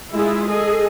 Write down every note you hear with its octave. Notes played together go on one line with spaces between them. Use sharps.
G#3 E4 F4 G#4
G#4 A4 D#5